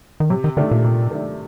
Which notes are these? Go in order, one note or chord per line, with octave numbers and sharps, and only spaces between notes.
D#3
C3 F#3
D#3
D3 D#3 A3 D4
A#2
C3
D#3 A3 D4